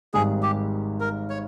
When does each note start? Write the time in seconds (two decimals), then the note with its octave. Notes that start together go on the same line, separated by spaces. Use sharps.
0.14 G#1 G#2 G3 G#4
0.43 G4
1.00 A#4
1.30 C#5